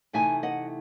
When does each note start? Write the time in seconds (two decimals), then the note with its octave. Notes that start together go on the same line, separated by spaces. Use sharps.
0.13 C3 E3 A3 D#4 E5 G#5
0.43 D#5 F#5